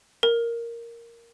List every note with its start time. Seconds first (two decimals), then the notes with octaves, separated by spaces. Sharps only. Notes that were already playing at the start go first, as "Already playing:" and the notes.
0.23 A#4